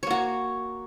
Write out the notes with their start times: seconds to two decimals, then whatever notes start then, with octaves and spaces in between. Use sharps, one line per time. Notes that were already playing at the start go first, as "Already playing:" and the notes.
0.03 C#5
0.07 A#3
0.11 F#4